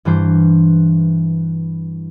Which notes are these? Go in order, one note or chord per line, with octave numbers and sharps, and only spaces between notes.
G2 E3 G3 C5